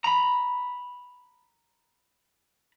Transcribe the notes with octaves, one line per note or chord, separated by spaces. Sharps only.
A#5 B5